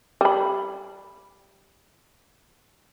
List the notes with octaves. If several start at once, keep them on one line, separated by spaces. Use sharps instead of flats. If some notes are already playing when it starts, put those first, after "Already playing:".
G3 B5